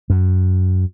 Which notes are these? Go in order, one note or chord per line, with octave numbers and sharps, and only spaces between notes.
F#2